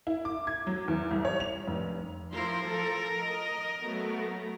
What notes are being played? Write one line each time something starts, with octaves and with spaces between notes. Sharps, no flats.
E4
D6
G#6
F#3
E2
C2
C#5
F7
F1
F3 E4 A#4 C6
F3 A4
D#5
F#3 A3 B3